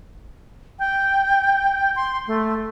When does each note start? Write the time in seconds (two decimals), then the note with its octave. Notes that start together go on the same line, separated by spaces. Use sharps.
0.79 G5
1.96 C6
2.27 A3